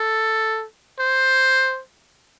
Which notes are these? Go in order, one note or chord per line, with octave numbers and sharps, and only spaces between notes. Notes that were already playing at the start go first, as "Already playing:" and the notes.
Already playing: A4
C5